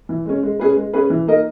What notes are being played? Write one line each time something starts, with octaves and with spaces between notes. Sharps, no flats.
E3
G#3 C#4
G#3
C#4 G#4 B4
G#3
C#4 G#4 B4
E3
A#3 D#4 A#4 D#5